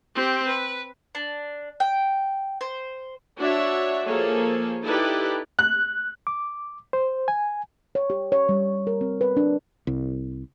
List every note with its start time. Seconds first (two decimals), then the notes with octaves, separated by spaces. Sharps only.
0.15 C4 G4
0.47 B4
1.15 D4
1.80 G5
2.61 C5
3.39 D4 F#4 C#5 E5
4.06 F3 A#3 G#4 A4 C#5
4.85 D#4 E4 G4 A4 B4 D5
5.59 F#6
6.27 D6
6.93 C5
7.28 G#5
7.95 C#5
8.10 G4
8.32 C#5
8.49 G3
8.87 A#4
9.01 C4
9.21 B4
9.37 D4
9.87 C2